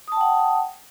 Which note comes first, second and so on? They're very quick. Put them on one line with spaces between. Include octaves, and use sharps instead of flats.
D#6 A5 G5 F#5